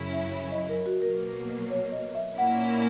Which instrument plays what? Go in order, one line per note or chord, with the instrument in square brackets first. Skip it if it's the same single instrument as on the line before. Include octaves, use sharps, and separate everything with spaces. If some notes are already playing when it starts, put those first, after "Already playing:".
Already playing: [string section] F#2 C#3 F#3 C#4 E4
[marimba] E5
E5
D#5
A#4
F#4
[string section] B2 F#3 A#3 [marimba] A#4
[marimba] C#5
D#5
E5
[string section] A#2 A#3 C#4 E4 [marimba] F#5